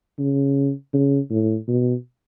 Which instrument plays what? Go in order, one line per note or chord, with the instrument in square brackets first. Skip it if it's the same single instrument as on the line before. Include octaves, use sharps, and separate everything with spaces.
[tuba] C#3
C#3
A2
B2